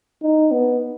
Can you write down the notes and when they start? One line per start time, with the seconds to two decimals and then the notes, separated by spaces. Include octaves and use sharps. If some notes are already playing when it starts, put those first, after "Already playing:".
0.22 D#4
0.51 B3